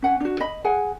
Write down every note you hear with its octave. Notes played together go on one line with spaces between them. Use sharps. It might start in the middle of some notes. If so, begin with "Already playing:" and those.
C#4 F#5 G#5
D4 F#4
D#5 B5
G#4 F#5 G#5